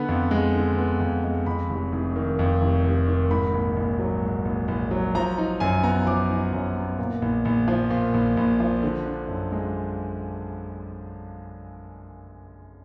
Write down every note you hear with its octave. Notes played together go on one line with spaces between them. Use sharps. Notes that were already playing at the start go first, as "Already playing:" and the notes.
Already playing: D3 B3 B5
F2
G#3
D3
B3
F2
G#3
F2 B5
F1
F1
D#3
F2
F1
F1
D#3
G#2 B5
A#1
A#1
F#3
G#2
A#1
A#1
F#3
F3 A#5
D#4
F#2 G#5
B3 A#5
F3 D6
D#4
F#2
B3
A#2
A#1
A#1
F3
A#2
A#1
A#1
F3
D3
D4
F#2
G#3